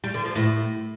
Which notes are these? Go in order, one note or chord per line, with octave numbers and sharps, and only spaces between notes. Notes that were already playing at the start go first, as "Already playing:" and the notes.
G3
D3
F3
A2